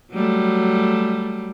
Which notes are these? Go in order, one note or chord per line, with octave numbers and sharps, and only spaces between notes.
F#3 G3 A3